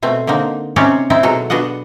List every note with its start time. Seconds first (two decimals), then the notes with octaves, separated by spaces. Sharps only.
0.02 B2 A3 C4
0.27 D3 A#3 C4 D#4
0.76 C3 C4 C#4 D#4 C#5 D5
1.10 C4 D#4 E4 C5
1.23 B2 F#3 G#3 F#4 A4
1.50 B3 D4 F#4 D#5 F#5